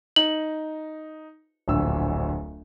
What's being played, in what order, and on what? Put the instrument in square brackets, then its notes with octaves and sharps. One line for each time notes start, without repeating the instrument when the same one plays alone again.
[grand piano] D#4 [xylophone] F#7
[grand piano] D1 A#1 E6